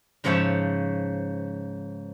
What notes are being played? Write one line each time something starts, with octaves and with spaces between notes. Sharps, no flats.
G#2 C#3 F3 C#5 E5 A5